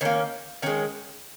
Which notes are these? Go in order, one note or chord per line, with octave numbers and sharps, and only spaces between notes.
D#3 A#3 C#4
D#3 G#3 C#4